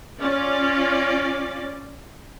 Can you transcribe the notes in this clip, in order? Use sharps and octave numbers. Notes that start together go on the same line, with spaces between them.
C#4 F4 D5